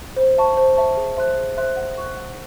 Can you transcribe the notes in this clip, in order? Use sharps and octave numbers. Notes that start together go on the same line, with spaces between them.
C5
E5 A5 C#6
C5
E5 A5 C#6
G#4
C5 E5 C6 F#6
G#4
C5 E5 C6 F#6
F#5
C#6 F#6
F#5